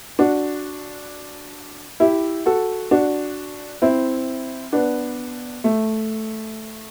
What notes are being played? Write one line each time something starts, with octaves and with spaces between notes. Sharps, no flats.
D4 F#4
E4 G4
F#4 A4
D4 F#4
C4 E4
B3 D4
A3